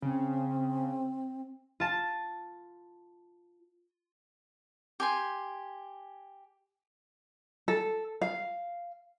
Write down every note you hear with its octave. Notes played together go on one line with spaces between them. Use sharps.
C#3 C4
F4 A5
G4 G#5 C6
A4
F5